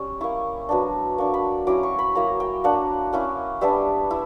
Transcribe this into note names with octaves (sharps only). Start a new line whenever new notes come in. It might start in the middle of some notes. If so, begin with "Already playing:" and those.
Already playing: G3 C#4
A#3 E4 C#6
F#3 B3 D4
A#3 D4 C#6
B5
F#3 C#4 E4 D6
C#6
B5
F#3 A#3 E4 A#5
G5
A#3 D4 F#5
A#3 C#4 E4
G3 B3 D4 E5
E4